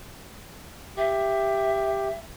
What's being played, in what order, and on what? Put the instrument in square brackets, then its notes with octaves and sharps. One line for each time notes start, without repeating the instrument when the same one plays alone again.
[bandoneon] G4 [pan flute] E5